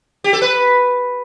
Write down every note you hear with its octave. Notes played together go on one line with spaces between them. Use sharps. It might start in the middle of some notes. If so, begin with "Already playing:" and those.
G4
A4
B4